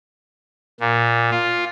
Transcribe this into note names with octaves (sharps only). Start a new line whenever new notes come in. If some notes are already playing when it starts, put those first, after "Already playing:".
A#2
F4